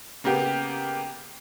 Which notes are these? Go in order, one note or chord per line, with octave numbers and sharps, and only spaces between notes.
C#3 A#3 B3 G4